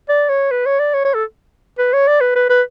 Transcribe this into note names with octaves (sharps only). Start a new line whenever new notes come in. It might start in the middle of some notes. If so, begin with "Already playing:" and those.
D5
C#5
B4
C#5
D5
C#5
C#5
A4
B4
C#5
D5
B4
B4
B4